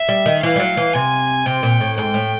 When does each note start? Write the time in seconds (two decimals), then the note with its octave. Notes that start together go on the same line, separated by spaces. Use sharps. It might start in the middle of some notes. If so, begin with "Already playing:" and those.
Already playing: E5
0.09 G3
0.26 D#3
0.43 E3 F5
0.56 G3
0.60 F#3
0.77 E3
0.94 C3 G#5
1.45 C3 G5
1.63 A#2
1.80 A2
1.97 G#2 G5
2.14 A2